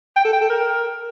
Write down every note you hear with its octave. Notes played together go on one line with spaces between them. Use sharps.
G5
A4
G5
A4
A#4